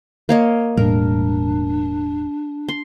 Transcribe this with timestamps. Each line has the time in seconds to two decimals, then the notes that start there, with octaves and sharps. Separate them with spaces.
0.29 A#3 C#5 D#5
0.77 E1 A2 G3 D4 A#4
2.69 C6